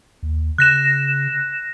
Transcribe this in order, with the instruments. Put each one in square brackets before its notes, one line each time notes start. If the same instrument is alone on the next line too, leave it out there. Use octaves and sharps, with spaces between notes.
[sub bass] D#2
[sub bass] C#3 [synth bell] F#6 A#6 E7